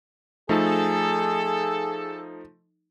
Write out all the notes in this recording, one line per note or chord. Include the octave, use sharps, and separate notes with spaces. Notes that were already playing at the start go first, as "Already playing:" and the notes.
F3 A3 D#4 G#4 A4